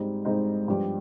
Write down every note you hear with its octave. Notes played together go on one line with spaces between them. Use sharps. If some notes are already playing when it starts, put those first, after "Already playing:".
Already playing: G#2 G3 C4 D#4
G#2 G3 C4 D#4
G2 F3 B3 D4 G4